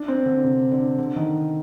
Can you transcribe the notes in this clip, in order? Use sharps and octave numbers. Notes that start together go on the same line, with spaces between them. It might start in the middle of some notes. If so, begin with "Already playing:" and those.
Already playing: D4
C4
D3
C3
D3
D3
D#3